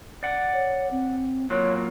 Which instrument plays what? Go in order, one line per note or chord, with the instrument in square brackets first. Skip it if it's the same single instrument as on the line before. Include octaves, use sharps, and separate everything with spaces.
[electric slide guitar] D5 F#5
[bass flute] C#5
C4
[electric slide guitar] F#3 A#3 F4 [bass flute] C#5